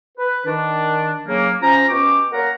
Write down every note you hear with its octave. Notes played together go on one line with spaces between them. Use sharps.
B4
D#3 D4
C#3 F#3 A#3
F3 C#4 C5 A#5
B2 C#4 F#4 G4 D6
A#3 A#4 C#5 F#5 A#5